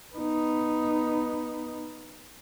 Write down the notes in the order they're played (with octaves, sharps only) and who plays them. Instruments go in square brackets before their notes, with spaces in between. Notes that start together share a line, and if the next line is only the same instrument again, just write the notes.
[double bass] B3 D#4